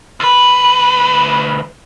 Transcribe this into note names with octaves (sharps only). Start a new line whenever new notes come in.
D2 B4